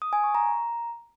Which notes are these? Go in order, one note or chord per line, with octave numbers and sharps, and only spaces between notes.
D#6
G#5
C#6
A#5